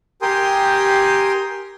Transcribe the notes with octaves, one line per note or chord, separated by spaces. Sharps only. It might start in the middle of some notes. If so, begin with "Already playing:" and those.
G4 A#4 G5 G#5 C6 D#6